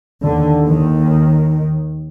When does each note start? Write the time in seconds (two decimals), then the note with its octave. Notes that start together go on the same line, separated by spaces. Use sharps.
0.24 D#2 D3
0.70 D#3